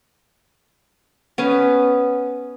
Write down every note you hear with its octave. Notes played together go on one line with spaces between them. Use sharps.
B3 C#4